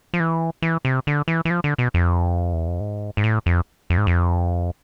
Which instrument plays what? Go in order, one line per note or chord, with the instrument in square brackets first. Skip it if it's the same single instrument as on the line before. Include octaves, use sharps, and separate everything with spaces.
[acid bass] F3
E3
E3
C3
D3
E3
E3
F3
D3
B2
F2
E2
F2
G#2
G#2
A2
F2
F2
G#2
F2